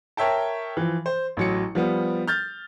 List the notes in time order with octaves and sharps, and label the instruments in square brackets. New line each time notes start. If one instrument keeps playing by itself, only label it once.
[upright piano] A#4 C#5 E5 G5 A5
E3 F3
C5
A1 F#3 C#7
F3 G3 B3
F6 G6 A6